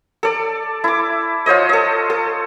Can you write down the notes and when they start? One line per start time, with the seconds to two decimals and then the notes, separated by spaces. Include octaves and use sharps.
0.23 A4 D5
0.84 E4 D6
1.46 F4 C5 C#5 D#5
1.69 A4 D#5
2.10 A4